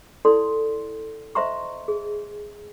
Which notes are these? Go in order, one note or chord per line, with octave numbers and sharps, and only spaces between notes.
E4 A4 D5 C6
C5 D#5 E5 A#5 C6 C#6
G#4